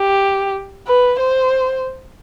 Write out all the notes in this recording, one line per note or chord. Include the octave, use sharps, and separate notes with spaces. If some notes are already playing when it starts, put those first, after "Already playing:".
Already playing: G4
B4
C5